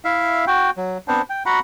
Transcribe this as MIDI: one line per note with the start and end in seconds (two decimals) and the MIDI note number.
0.05 0.45 64
0.05 0.45 76
0.05 0.45 77
0.47 0.70 66
0.47 0.70 79
0.77 0.98 54
1.08 1.22 59
1.08 1.22 60
1.08 1.22 62
1.08 1.22 72
1.30 1.43 79
1.46 1.60 66
1.46 1.60 78
1.46 1.60 82
1.46 1.60 83